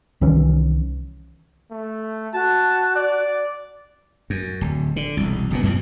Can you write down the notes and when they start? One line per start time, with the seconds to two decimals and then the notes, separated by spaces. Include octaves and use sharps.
0.21 C2 D#3 E3 C#4
1.71 A3
2.33 F#4 A5
2.96 D5
4.30 F#2
4.61 D1
4.96 D3
5.17 E1 C2
5.50 F#1 A#2 B3
5.63 F#2 B2 E3 F3